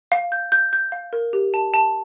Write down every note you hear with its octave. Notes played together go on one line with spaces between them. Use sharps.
F5
G6
G6
G6
F5
A#4
G4
A5
A5